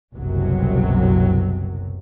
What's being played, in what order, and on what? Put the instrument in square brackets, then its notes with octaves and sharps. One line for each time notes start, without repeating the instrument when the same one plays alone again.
[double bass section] F#1 C2 F#2 B2 F#3